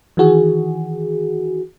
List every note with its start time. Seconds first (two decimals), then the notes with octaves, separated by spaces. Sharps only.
0.17 D#3 E3 F#4 G#4